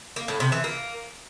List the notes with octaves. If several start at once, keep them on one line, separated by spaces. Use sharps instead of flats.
A#3
A2
C3
E3
A#3